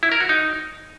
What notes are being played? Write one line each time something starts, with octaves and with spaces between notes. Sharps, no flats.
E4
A#4
F#4
D#4